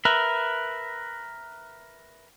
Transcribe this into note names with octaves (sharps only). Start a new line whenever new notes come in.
A#4 B4 E5